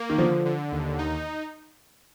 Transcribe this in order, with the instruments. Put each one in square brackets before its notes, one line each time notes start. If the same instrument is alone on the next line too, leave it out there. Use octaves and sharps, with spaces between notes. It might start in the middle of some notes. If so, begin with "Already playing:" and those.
Already playing: [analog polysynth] A#3
[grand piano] D#3
[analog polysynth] D3 [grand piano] F3
[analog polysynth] D3
D#2
D#4